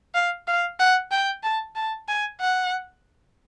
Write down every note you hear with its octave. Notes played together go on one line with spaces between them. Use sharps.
F5
F5
F#5
G5
A5
A5
G#5
F#5